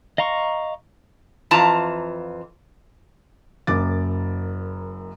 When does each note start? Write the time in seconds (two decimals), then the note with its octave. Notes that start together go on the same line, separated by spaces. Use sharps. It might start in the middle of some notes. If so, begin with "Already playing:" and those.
0.18 D#5 F5 A#5 C6 C#6
1.51 F2 E3 F4 A5 A#5
3.67 F#1 F#2 D6 A6